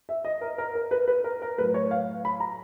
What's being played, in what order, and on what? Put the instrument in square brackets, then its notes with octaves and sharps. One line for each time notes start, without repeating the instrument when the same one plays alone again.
[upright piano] E5
D#5
A#4
A#4
A#4
B4
B4
A#4
A#4
A2 F#3 B4
C#5
F5
B5
A#5